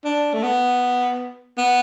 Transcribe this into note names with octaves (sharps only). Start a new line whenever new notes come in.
D4
A3
B3
B3